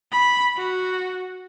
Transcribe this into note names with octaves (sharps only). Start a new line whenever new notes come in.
B5
F#4